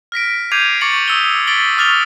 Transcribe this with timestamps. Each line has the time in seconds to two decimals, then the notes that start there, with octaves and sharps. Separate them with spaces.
0.12 F6 A#6 B6 D7
0.52 D6 G6 G#6 C7 D#7 F7
0.81 C#6 D6 A6 B6 C#7 F#7
1.08 D#6 E6 G7
1.47 A6 B6 D7 F#7 G7
1.77 C#6 D6 F6 A6 F7 G7